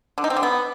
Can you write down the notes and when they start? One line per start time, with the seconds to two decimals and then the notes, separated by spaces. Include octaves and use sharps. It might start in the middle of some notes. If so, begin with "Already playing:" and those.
0.18 D3
0.24 D#4
0.30 C4
0.37 D3
0.43 B3